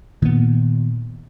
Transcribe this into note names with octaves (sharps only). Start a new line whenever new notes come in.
A#2 D#3 B3